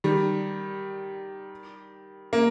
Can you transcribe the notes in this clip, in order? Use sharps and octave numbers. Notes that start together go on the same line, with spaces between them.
D#3 G3
A#3